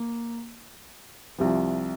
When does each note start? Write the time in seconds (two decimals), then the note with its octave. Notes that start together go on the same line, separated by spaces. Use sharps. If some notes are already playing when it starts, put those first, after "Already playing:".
Already playing: A#3
1.38 C2 C3 F3